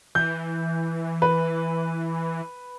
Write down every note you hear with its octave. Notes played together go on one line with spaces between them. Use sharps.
E3 G6
B4